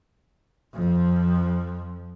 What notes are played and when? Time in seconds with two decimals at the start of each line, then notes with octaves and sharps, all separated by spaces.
0.74 F2 F3